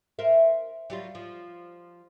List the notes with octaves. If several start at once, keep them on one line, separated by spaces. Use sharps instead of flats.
A#4 C5 E5
F#3 G3 F4
F3